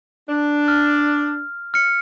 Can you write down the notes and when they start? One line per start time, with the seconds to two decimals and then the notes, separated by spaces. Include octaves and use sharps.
0.29 D4
0.68 F6
1.74 F6 C#7